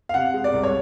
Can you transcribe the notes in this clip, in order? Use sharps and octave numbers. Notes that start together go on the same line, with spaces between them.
F5
C3 F#5
G#3
D5
C2
C#5